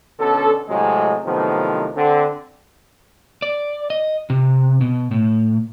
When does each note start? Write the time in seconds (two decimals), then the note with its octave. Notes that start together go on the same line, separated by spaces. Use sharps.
0.19 B2 D3 C#4 A4
0.69 A2 C3 F#3 G#3
1.25 A2 C3 D#3 F3 F#3 B3
1.96 D3 C4
3.42 D5
3.90 D#5
4.30 C3
4.81 B2
5.11 A2